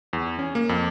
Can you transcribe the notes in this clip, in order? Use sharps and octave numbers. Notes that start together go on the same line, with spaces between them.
E2
C#4
A#3
F2